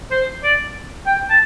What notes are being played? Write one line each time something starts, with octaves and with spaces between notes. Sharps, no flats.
C5
D5
G5
A5